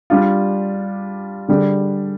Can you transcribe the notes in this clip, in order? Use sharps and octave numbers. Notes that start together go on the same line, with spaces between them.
G3 D4 F4
D3 G3 D4 G#4